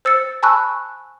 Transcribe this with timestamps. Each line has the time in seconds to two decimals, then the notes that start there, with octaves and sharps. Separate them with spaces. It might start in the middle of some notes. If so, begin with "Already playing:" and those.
0.05 C5 E6 A6 C#7
0.43 G#5 A5 B5 C#6 E6 F#6